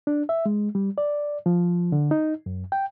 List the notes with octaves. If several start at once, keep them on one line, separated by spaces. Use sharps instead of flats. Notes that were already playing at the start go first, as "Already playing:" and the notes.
D4
E5
G#3
G3
D5
F3
D3
D#4
F#2
G5